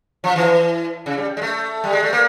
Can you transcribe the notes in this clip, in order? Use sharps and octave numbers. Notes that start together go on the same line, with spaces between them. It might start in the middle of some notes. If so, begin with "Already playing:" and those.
F3
E3
C#3
G3
G#3
A3
G3
G#3
A3
A#3